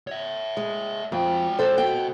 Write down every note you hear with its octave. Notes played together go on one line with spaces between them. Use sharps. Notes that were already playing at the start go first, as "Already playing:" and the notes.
C#5 E5
G#3
F2 G#3 G5
A4 C5
B3 F#4 G5